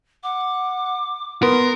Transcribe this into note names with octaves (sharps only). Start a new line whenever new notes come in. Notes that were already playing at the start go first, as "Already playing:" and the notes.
F#5 D6
B3 A#4 C6